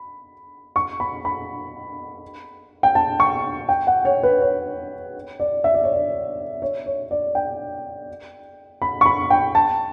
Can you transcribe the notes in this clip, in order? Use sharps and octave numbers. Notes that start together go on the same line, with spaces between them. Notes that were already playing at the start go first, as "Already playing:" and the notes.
Already playing: B5
C#6
B5
B5
G5
A5
C#6
G5
F#5
C#5
B4
C#5
D5
E5
D5
C#5
D5
C#5
C#5
D5
G5
B5
C#6
B5
G5
A5